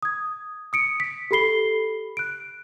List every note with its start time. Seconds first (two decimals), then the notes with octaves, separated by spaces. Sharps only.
0.03 D#6 G#6
0.73 D#6 C#7 D7
1.00 B6
1.31 G4 A4 B5 C7 G7
2.17 F#6 D7